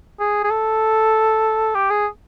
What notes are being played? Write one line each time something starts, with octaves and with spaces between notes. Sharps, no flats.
G#4
G#4
A4
G4
G#4